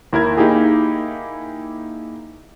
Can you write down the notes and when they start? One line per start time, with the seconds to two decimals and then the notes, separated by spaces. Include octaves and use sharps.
0.13 D#2 E4 A#4 G#6
0.37 A#3 D#4 E4 G4 G#4